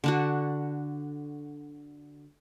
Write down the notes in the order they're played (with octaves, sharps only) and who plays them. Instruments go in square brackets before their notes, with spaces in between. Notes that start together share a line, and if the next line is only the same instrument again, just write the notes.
[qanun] D3 D4 F#4